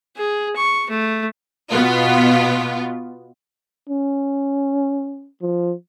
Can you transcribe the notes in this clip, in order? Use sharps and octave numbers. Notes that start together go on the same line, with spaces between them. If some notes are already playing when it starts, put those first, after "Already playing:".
G#4
C#6
A3
B2 B3 F4
C#4
F3